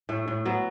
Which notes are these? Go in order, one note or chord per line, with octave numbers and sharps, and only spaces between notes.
A2 A3
A2
F#3 B3